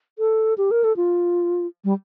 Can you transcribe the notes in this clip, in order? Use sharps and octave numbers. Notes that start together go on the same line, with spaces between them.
A4
G4
A#4
A4
F4
G3